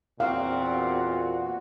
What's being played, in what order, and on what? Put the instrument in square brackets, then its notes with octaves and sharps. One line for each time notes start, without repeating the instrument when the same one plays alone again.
[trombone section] E2 A#2 [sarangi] C4 [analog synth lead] F#4 [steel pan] F5